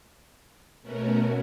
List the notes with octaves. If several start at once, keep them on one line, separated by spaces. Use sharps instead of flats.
B2 A3 B3 C#4 F#4 A#4